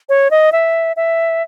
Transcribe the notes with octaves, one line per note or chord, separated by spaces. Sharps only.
C#5
D#5
E5
E5